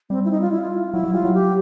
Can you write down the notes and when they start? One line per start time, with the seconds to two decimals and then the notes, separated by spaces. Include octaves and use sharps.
0.10 G3 C4
0.25 E4
0.31 D#4
0.41 F4
0.52 E4
0.62 F4
0.93 F#3 E4
1.04 F#3
1.14 G3 F4
1.24 F#3
1.34 G4